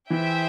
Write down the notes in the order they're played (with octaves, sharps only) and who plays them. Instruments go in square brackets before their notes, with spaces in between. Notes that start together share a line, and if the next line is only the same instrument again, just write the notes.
[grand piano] E3 [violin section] G#4 C5 E5 G5